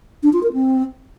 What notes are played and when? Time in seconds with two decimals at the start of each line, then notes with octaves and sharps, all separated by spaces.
0.23 D4
0.33 F4
0.43 A#4
0.53 C4